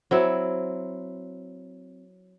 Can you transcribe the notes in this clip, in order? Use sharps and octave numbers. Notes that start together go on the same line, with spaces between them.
F#3 C4 E4